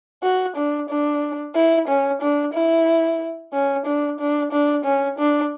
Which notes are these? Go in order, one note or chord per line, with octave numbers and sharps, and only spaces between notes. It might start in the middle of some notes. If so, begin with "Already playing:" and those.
F#4
D4
D4
E4
C#4
D4
E4
C#4
D4
D4
D4
C#4
D4